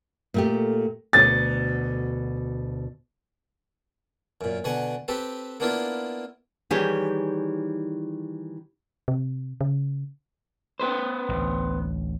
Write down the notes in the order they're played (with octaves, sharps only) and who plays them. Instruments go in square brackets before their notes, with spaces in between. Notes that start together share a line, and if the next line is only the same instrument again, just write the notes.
[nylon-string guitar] A#2 A3 G4
[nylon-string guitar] D2 B2 [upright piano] A6
[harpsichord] F#2 A#2
B2 D3 F#5 G#5
C4 G4 A4 B4
A#3 B3 D4 E4 F4 A#4
[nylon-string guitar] D#3 E3 G3 G4 G#4 C#5
[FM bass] C3
C#3
[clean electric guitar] B3 B4 C5
[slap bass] A1 D2